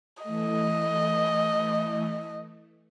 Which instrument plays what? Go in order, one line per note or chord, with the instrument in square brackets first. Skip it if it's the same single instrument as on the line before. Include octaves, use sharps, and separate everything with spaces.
[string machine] E3 A3 [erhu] D#5